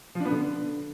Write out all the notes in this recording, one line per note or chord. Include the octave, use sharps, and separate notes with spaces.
F3
D4
B3
D3